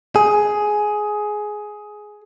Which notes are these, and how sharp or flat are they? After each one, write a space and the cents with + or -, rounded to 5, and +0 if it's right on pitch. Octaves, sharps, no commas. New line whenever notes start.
G#4 +10